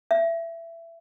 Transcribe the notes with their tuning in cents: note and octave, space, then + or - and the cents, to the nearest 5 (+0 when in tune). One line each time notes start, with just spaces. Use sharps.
E5 +20